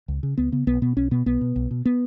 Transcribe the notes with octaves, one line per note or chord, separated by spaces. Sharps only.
C#2
C#3
C#2 B3
C#3 B3
B1 B3
B2 B3
B1 C#4
B2 B3
B1 B3
B2
B1
B2
B3